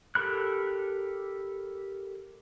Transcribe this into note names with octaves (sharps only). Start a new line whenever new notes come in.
G4 A4 A#4 B5 F#6